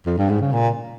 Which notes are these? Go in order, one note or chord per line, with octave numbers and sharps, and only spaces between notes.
F2
G2
G#2
C#3
A#2